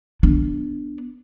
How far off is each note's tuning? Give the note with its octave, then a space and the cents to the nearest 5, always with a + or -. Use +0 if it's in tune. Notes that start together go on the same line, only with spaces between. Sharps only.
B3 +0 D4 +0